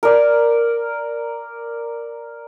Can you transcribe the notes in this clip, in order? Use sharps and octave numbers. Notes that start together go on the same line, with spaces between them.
A#4 D5